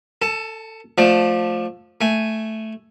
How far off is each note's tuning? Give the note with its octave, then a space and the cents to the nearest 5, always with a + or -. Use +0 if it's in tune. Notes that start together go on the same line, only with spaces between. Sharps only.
A4 +20 A5 -30
F3 +20 A3 +0 D5 +25
A3 +0 G#5 +0